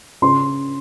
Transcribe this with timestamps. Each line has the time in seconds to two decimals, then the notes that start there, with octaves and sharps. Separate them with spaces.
0.22 C#3 C6